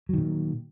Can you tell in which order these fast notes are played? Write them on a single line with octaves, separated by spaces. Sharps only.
F#3 D#3 A#2